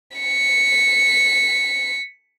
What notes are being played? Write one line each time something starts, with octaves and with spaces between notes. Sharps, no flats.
B6 C#7